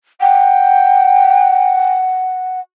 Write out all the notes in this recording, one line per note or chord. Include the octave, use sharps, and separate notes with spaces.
F#5 G5